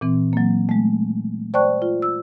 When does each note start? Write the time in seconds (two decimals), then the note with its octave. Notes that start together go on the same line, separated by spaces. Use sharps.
0.01 A#2 E3 C4
0.33 F#3 A#3
0.69 G#3 A3
1.54 C5 D5 G5 A5 C#6 F#6
1.82 F4
2.02 E6